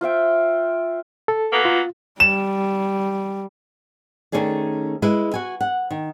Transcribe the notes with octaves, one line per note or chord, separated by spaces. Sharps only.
F4 C5 E5 G5
A4
F#3 A#3 B3
F4
G3 E7
D#3 G#3 A3 C#4 G#4 D5
G#3 E4 B4
F#4 G#5
F#5
D#3